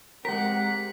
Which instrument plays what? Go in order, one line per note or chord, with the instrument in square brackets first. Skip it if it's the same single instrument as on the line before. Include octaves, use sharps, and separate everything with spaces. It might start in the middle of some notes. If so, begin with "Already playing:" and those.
[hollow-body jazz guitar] G#3 A#4 [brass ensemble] C4 G4 F#5 [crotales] B6